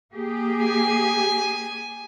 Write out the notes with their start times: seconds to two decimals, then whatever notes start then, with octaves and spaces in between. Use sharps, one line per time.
0.12 A#3 G4 G#4
0.63 G#5